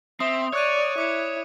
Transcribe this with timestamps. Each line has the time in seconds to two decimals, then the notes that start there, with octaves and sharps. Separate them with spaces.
0.20 C4 E5 D#6
0.53 C#5 D5 D#6 F#6 D#7
0.98 E4 D6 C#7